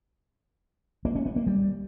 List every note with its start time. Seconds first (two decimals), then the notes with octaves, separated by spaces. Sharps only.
1.05 A#3
1.15 C#4
1.26 B3
1.36 A#3
1.47 G3